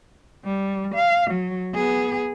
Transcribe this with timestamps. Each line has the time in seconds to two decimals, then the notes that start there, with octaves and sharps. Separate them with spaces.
0.44 G3
0.95 F5
1.30 F#3
1.74 B3 G#4